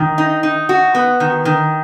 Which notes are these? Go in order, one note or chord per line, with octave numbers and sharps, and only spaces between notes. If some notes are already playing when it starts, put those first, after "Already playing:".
Already playing: D#3
D#4
D#4
F#4
B3
D#3
D#3